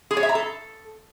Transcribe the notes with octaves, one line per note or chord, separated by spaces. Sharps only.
G#4
C#5
E5
A#5
A4